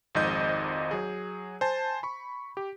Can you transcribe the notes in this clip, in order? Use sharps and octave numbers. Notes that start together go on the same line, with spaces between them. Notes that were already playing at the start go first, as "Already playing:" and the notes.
G#1 F2 G#2 D#5 G6
F#3 G#4
C5 G#5 A5
B5 C#6
G4